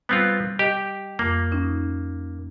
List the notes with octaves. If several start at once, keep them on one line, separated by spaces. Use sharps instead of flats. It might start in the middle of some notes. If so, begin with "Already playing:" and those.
G3 B3 C4 F4
G4 D#5
F2 A#3
C#4 D#4